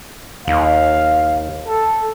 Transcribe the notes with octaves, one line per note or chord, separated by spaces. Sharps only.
D#2 F5
A4